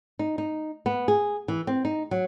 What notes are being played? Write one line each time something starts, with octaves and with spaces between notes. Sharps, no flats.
D#4
D#4
B3
G#4
E3
C4
D#4
F#3